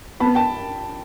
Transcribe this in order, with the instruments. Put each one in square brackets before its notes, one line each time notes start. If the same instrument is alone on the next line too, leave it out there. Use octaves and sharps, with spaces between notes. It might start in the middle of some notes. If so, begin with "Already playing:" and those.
[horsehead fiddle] B3 [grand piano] A5 B5
[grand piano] G5 A5